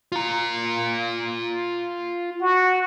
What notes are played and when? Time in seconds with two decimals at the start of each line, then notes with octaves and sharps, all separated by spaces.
0.12 F4 A#5
2.42 F#4